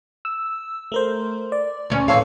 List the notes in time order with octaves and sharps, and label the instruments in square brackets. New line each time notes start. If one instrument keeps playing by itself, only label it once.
[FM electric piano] E6
A3 A#4 C5
D5
[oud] D2 C#4
[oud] E2 C4 F5 [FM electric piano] A2 A4 C#5